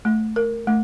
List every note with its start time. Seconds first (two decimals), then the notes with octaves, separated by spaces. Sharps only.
0.05 A3
0.36 A#4
0.67 A3